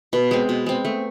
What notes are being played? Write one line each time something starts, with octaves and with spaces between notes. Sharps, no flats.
B2 B3
G#3 C4
B2
G#3 C4
A3